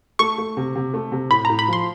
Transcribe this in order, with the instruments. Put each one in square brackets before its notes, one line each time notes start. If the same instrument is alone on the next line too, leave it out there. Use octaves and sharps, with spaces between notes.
[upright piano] A3 [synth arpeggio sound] C#6
[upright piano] A3
C3
C3
A3
C3
[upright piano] A2 [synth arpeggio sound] B5
[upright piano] A2 [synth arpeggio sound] A#5
[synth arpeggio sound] B5
[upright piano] F3 [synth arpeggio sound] C6